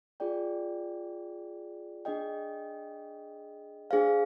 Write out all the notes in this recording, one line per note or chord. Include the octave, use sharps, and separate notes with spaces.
F4 G#4 D5 G5
D4 G#4 D#5 G5
D4 G#4 C5 F5